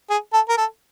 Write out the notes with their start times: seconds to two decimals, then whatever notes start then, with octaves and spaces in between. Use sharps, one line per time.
0.10 G#4
0.33 A4
0.49 A#4
0.57 A4